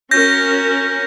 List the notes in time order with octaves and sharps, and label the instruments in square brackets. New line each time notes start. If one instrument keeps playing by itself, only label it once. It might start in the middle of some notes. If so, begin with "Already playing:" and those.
[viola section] C#4 F#4 A#4 [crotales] G6 A#6